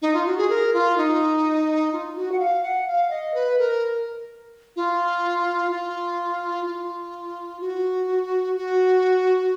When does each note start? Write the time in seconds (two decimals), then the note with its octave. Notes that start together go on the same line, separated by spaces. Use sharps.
0.02 D#4
0.14 F4
0.26 F#4
0.38 G#4
0.50 A#4
0.74 F4
0.98 D#4
1.92 F4
2.16 F#4
2.32 F#5
2.39 F5
2.63 F#5
2.87 F5
3.10 D#5
3.34 B4
3.58 A#4
4.76 F4
5.71 F4
6.66 F4
7.61 F#4
8.56 F#4